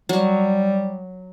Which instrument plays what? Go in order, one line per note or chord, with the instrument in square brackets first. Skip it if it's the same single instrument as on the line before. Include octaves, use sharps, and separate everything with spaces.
[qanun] F#3 [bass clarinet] G3